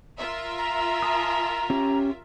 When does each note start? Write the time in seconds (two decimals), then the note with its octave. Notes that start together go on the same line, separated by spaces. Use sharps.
0.18 F4 A#4 E5
0.58 A#5
1.02 G#5 A5 D#6
1.70 C#4 G4